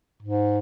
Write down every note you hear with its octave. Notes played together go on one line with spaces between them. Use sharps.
G#2